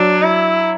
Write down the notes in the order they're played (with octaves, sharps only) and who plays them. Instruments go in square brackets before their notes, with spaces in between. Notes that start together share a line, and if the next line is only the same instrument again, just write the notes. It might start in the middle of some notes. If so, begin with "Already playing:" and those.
Already playing: [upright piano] F#3 [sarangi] D4
[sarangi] E4